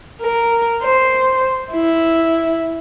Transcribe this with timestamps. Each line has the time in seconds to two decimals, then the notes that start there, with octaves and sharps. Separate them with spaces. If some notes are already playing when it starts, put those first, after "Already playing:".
0.21 A#4
0.83 C5
1.72 E4